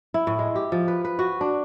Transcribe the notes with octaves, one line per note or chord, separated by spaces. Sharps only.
E4
A2
G#3
G4
F3
B4
B4
F#4
D4